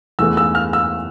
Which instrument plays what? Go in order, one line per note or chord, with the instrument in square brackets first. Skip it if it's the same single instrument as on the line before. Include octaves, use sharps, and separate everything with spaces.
[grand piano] E2 E3 A3 E6
E6
F6
E6